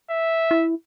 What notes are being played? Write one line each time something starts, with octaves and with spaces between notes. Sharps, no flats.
E5
E4